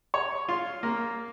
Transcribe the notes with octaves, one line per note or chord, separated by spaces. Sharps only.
C#5
F4
A#3